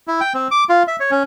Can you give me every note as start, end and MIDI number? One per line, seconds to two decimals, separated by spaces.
0.08 0.20 64
0.21 0.33 79
0.34 0.48 60
0.51 0.64 86
0.69 0.83 65
0.88 0.96 76
1.00 1.11 73
1.11 1.23 61